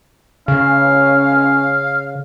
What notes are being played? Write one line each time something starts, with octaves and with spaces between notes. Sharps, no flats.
C#3 C#4 F5